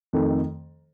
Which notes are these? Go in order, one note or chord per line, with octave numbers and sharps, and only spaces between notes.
F2 D#3 A3